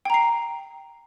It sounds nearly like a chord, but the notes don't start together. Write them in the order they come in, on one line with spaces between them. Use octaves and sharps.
G5 A#5 C7